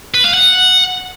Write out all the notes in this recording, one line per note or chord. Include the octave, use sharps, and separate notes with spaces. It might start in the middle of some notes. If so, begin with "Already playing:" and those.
B4
F5
F#5